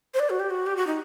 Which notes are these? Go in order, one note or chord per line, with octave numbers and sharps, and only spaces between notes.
C5
D5
F#4
G4
F#4
G4
F#4
D#4